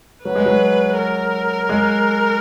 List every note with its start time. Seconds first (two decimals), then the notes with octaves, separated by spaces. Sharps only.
0.25 F#3 B4
0.35 G#3
0.46 F#3
0.98 A#4
1.69 G#3